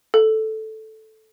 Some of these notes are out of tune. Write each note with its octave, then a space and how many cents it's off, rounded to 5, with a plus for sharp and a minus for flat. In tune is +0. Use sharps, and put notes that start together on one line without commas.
A4 -5